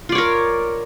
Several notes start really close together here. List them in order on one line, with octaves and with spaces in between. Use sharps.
F4 D5 C#5 A#4